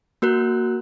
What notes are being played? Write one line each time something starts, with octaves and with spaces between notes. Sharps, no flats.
A#3 F#4 A#4 F#6